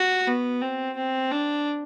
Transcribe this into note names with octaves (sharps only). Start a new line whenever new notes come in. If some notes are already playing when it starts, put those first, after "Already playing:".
Already playing: F#4
B3
C4
C4
D4